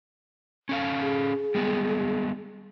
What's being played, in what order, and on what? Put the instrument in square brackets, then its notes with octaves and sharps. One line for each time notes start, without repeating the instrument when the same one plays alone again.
[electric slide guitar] C#4 A4 F5
[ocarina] G#4
[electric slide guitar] G3 G#3 B3